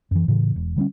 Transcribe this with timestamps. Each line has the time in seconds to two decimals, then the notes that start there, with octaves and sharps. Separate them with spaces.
0.11 F#2 E3
0.28 A2 C#3 E3
0.56 E1
0.76 D3 G3 B3 C#4